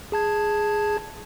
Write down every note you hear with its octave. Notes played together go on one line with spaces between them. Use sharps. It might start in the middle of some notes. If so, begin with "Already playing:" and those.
G#4 A5 G#6